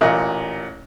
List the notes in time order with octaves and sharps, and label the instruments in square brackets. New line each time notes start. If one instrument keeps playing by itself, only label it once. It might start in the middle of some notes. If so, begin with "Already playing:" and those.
[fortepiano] A1 A#2 D#5